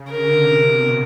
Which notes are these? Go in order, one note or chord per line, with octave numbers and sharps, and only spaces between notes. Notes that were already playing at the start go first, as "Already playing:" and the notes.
Already playing: C#3
D3 A#4
C3
B2